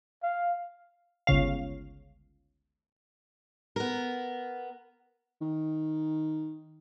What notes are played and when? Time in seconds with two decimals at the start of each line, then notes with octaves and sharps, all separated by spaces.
0.23 F5
1.27 G1 C#2 C#3 F5
3.76 B3 A#4
5.41 D#3